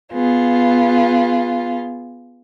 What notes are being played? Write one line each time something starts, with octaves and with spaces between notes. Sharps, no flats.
B3 F4 G#4